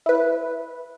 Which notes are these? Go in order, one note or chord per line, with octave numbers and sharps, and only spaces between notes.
E4 B4